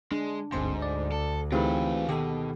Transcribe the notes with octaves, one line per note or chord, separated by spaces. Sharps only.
G#3 D4
G1 D2 G#2 C4 C6
D5
A4
E3 A3 C4 D#4 F4 G4 G#4 B4
B2 D#3 G4 A4